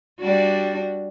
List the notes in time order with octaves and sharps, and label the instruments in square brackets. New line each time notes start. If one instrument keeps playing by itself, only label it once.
[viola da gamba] G3 D4 F#4